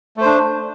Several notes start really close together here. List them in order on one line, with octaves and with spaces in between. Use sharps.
A3 C5 D4